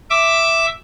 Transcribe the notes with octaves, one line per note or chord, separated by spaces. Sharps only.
E5 D6